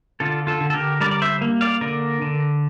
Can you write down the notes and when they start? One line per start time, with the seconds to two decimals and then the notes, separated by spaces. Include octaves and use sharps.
0.20 D3 F4 A4
0.47 F4 A4
0.61 D3
0.70 A4
0.74 G4 A#4
1.00 G3 A#4 D5
1.11 D5
1.22 C5 E5
1.41 A#3
1.61 D5 F5
1.81 D3 A#4 D5
2.22 D3